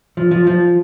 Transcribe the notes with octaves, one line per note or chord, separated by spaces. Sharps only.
F3
F3
F3